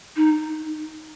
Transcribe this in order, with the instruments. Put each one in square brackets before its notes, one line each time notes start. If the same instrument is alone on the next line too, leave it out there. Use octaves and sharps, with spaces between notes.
[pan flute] D#4